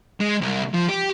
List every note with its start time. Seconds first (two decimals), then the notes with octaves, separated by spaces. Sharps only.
0.21 G#3
0.42 C2
0.74 F3
0.89 G4